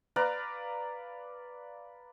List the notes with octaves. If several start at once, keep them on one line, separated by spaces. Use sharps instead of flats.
B4 D5 F5 A#5